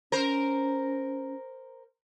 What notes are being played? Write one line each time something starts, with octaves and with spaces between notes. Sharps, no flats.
C#4 A#4 C5